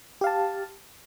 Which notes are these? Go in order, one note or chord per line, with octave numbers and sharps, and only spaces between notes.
G4 F5 A5